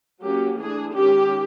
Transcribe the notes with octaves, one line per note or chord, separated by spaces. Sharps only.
F#3 A#3 C#4 G4
E3 A3 D4 G#4
D#3 G#3 C#4 G4